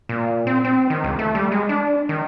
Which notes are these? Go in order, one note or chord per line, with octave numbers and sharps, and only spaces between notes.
A#2
C4
C4
D#3
C#2
A3
G3
G#3
D4
D#3